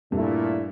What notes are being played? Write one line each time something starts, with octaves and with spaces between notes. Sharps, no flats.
G2 A#2 A3 E4